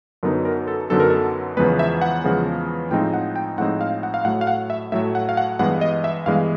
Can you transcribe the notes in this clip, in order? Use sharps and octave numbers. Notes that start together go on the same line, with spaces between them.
F#2 D3 F#3 B3 D#4 A#4
A#4
A4
F#2 D3 F#3 B3 D#4 A4
A#4
A4
E2 C#3 F3 G#3 B3 B4
E5
F#5
E2 C#3 F3 G#3 B3
A2 F3 G#3 C4 D#4 G5
F#5
G5
A2 F3 G#3 C4 D#4 F#5
F5
F#5
F5
A2 F#3 A3 F#5
F5
F#5
E5
A2 F#3 A3 E5
F#5
F5
F#5
G2 E3 G#3 B3 F#5
D#5
E5
G2 E3 G#3 B3 F5